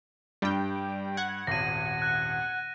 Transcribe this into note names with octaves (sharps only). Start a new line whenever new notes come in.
G2 G3 G5
F#5 G#6
D#1 G#1 A#6 D#7
F#6